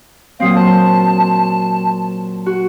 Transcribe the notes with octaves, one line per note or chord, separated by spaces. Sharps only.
A#2 F#3 C4 F5 D#6
C5 A5
F#4